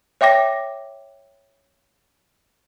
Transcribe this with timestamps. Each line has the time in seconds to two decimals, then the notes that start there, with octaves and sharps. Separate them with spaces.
0.21 C#5 E5 G5 D6 A#6